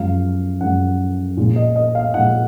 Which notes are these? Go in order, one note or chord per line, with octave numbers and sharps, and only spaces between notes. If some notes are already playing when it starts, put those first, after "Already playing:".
Already playing: F#2 F3 G#3 F5
F#2 F3 G#3 F#5
A#2 F3 G#3
D#5
D#5
F5
A#2 F3 G#3 F#5